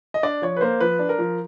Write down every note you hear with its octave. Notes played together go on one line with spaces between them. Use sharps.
D#5
D4 D5
F3 C#5
B4
A#3 C5
F3 B4
D4
A#4
F3